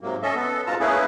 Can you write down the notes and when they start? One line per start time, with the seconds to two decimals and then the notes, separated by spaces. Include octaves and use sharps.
0.01 G#2 C3 F#3 A#3
0.22 C#4 A4 D#5 E5
0.36 B3 A4
0.67 G#2 B2 F4 A5 A#5
0.80 A3 A#3 C#4 E4 G#4 B4